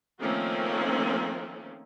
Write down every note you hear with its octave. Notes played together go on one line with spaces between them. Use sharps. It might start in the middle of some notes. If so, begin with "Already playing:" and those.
D#3 F3 A3 A#3 C4 C#4